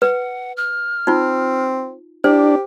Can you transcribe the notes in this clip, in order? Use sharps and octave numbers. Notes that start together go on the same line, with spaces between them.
B4 F#5
F6
C4 D#4 F4
D4 E4 G4 C5